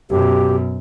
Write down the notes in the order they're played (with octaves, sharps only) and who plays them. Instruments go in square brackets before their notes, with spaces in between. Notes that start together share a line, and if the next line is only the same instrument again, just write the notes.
[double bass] F#2 B2 [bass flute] G4